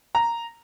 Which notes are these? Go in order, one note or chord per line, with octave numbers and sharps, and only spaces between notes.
A#5